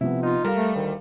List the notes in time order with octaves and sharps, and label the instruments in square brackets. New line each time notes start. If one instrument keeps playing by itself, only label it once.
[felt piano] C3 F3 B3 [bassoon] E4
[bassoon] D#4 [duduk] F4
[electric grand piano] G3 [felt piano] A4 F5 [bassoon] A#4
[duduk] A3
[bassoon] D2 [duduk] D#3